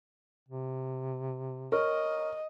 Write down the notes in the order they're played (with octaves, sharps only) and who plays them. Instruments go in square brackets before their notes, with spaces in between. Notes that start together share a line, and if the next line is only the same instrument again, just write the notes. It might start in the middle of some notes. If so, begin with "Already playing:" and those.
[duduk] C3
[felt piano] A#4 [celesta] C#5 C#6 F6 [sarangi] D#5